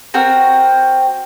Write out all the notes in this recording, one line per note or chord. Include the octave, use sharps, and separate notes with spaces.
C4 F#4 A#4